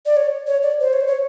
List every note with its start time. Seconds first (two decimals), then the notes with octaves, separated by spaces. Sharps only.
0.06 D5
0.17 C#5
0.47 C#5
0.63 D5
0.80 C5
0.93 C#5
1.01 C5
1.07 C#5